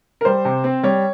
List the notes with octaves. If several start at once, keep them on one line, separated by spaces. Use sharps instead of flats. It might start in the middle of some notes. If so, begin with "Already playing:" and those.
A#4
G3 C5
C3
C4
G3 C#5